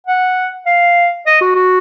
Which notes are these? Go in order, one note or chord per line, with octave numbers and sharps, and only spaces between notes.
F#5
F5
D#5
F#4
F#4